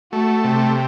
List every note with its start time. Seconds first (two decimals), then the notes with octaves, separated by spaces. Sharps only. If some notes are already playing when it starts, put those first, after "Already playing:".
0.12 A3 F#4
0.44 C3 G4